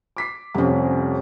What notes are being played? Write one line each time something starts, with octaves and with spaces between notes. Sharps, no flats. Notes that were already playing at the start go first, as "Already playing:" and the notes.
D6 B6 C7
F1 F2 G3 C#4